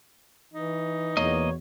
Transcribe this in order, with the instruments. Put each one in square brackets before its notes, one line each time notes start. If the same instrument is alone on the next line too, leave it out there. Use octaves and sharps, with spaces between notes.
[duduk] E3 [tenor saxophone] D#4
[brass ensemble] E2 B2 [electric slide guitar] A#3 D#5 [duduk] C#5